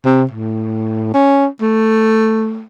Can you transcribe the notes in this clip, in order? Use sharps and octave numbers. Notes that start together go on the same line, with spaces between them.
C3
A2
C#4
A3